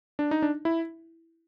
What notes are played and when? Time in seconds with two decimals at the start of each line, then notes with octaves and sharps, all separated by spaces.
0.19 D4
0.31 D#4
0.42 D4
0.65 E4